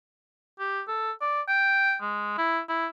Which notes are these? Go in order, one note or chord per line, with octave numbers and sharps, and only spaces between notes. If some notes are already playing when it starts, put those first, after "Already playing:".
G4
A4
D5
G5
G#3
E4
E4